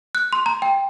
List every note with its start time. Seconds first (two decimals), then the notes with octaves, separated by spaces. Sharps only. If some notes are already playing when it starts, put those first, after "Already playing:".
0.15 F#6
0.33 C6
0.46 A#5
0.62 G5